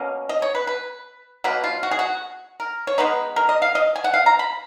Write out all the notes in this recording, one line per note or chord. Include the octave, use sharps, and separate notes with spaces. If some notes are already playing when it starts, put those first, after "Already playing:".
Already playing: B2 A#3 C#4
D#5
C#5
B4
B4
B2 F#3 A#3 B4
F4
F#4
G#4
F#4
A#4
C#5
D#3 G#3 B3 D#4 B4
A#4
D#5
F5
D#5
G#5
F#5
F5
A#5
B5